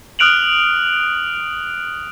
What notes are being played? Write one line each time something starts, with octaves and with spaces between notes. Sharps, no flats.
D#6 F6 F#6 D7 F7 F#7